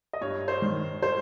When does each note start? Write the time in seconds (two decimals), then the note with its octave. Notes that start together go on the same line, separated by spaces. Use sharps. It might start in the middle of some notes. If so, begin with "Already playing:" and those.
0.13 D#5
0.21 G2 C#5
0.48 C5
0.62 D#3
1.02 C5